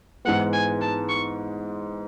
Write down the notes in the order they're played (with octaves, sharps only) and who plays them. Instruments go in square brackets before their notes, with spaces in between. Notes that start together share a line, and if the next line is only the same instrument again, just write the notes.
[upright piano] G#2 E3 G#3 B3 [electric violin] F#5
[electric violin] G#5
A5
C#6